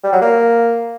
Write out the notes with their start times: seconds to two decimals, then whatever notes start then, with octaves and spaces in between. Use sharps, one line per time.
0.04 G3
0.13 F#3
0.22 A#3